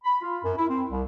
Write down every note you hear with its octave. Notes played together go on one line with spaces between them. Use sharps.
B5
F4
F#2
E4
C4
C2